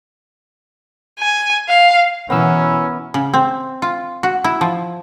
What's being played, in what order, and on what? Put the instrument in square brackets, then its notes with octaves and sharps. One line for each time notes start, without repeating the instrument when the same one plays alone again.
[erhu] G#5
F5
[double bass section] B2 E3 [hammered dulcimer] B3 A#4 [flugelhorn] C#4 [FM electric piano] F#5 E6
[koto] C#3
C4
F4
F#4
E4
F3